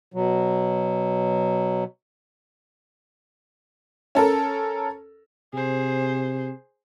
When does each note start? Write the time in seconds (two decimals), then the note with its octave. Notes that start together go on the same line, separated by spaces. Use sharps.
0.14 B2 F#3
4.15 C#4 A4 A#4
5.54 C3 G#4 C5